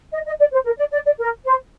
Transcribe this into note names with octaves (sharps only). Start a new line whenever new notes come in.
D#5
D#5
D5
C5
A#4
D5
D5
D5
A#4
C5